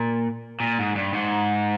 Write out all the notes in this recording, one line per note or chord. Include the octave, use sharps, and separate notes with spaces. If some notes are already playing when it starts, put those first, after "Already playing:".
Already playing: A#2
A#2
G#2
G2
G#2